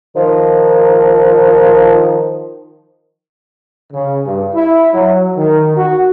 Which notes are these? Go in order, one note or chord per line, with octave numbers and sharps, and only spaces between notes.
D#3 F3
C#3
G2
E4
F#3
D#3
F#4